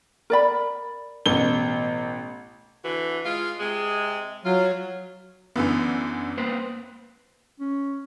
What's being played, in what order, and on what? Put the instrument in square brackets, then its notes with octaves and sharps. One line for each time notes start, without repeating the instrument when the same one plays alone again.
[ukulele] A#4 D5 B5
[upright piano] A1 B2 G7
[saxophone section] D3 E3 F#4
G#3 F4
C3 G#3
[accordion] F#3 [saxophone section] F4
[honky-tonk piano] F#2 D3 E3 [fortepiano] B3
[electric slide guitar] A#3 B4 C5
[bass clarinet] C#4